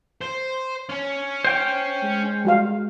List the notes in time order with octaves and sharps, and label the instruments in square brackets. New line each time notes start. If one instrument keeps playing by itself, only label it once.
[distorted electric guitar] C5
C#4
[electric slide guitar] C5 G5
[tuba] G#3
[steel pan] G3 F#4 F5